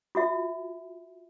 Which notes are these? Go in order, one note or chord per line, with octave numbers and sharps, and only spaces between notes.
F4 F#4 E5